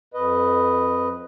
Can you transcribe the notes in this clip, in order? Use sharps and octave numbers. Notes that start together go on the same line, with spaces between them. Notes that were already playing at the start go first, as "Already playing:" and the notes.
F2 B4 D#5